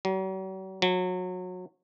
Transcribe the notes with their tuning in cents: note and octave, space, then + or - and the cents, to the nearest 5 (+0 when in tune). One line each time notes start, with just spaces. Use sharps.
F#3 +45
F#3 -25